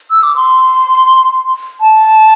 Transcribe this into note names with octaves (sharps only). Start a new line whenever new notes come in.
E6
D6
C6
A5